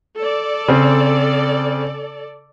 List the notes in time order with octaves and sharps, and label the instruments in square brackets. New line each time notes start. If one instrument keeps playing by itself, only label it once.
[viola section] A4 D5
[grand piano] C#3 C4